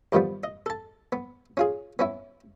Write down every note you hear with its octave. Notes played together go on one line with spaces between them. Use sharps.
G2 D#3 F3 G3 B3
D#5
A4 A5
B3
C#4 F4 G#4
B3 C#4 E4